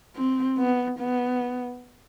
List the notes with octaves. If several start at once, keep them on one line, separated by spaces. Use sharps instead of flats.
C4
B3
B3